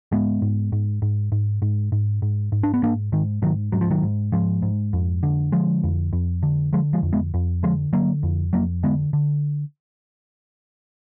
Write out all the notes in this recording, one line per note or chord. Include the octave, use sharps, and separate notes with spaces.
G#2 G#3 B3
G#2
G#2
G#2
G#2
G#2
G#2
G#2
G#2
D4
B3
G#2 A#3 D4
G#2 D#3
G#2 D#3 F#3
G#2 F#3
F3
D#3 F#3
G#2
G#2 F3 G#3
G#2
F2
D3
D3 F3 G#3
F2
F2
D3
D3 F3 G#3
F3 G#3
F2
G#3 B3
F2
D3 F3 G#3
D3 F#3 A#3
F2
F2 F#3 A#3
D3 G#3 B3
D3